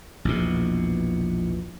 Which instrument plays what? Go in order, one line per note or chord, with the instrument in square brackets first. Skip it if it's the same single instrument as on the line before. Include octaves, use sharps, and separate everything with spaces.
[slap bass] A#1 E2 B2